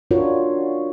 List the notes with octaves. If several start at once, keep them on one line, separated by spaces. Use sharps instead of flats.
D4 F4 F#4 A#4 C#5